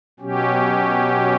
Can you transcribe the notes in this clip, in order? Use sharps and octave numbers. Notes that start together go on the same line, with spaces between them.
B2 F#3 C#4 G4